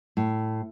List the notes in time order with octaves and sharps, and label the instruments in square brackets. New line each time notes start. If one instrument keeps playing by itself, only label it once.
[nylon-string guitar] A2